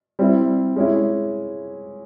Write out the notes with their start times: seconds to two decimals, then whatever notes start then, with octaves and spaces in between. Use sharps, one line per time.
0.19 G3 C4 E4
0.76 G#3 C#4 E4